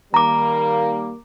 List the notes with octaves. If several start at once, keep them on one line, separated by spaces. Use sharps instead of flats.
D#3 G3 A#3 A#5 D6